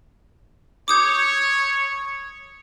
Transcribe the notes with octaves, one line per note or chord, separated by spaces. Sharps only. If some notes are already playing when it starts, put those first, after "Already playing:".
C#5 D6 D#6 G6